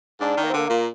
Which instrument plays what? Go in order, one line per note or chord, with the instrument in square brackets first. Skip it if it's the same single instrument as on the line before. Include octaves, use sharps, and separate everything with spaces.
[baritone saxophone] G#2 [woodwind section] D4
[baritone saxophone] D#3
[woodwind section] A#3
C4
[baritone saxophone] D3 [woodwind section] A#3
[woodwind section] A#3
[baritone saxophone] A#2